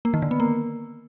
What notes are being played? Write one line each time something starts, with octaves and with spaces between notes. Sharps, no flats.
A#3
D#3
D3
B3
A#3